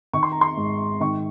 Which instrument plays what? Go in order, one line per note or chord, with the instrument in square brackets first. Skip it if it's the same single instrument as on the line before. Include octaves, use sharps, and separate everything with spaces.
[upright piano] D#3 C#6
C6
A#5
C6
G#2
D#3 C#6